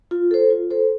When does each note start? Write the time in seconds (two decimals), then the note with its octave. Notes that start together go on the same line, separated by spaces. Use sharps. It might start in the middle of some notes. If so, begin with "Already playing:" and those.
0.11 F4
0.31 A4 C5
0.50 F4
0.71 A4 C5